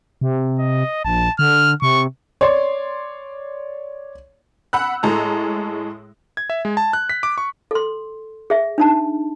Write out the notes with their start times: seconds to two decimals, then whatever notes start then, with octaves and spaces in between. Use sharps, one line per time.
0.21 C3
0.59 D#5
1.05 A#1 A5
1.39 D3 F6
1.82 C3 C#6
2.41 C#5 D5 C6
4.73 F#5 B5 E6 F#6
5.03 A2 G#3 A4 A#5
6.37 G#6
6.50 E5
6.65 G#3
6.77 A5
6.93 F#6
7.09 B6
7.23 D6
7.38 C#6
7.71 A4 C6
8.50 G#4 E5
8.78 D4 D#4 A5